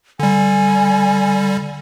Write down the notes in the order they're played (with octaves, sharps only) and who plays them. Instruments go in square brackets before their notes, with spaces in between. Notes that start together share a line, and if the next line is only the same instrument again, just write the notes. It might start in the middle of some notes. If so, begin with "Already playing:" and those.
[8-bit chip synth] D3 G3 [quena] G#5